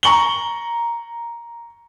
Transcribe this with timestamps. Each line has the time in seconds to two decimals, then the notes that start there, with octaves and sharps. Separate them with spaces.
0.03 A#5 C#6 F#7 G7